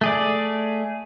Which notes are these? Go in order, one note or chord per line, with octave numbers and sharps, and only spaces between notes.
A3 G#4 D5